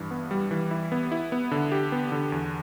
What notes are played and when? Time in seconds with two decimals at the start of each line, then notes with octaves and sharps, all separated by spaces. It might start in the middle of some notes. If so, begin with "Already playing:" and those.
Already playing: G2 E3
0.11 B3
0.31 G3
0.51 E3
0.71 E4
0.92 B3
1.12 E4
1.32 B3
1.51 D3
1.72 G4
1.92 B3
2.12 D3
2.32 E2